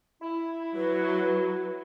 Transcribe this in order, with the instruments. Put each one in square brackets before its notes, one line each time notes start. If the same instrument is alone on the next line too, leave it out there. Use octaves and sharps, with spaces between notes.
[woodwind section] E4
[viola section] F#3 [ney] B4